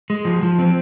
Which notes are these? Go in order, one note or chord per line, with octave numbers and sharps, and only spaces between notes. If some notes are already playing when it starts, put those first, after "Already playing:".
G#3
F3
F3
C4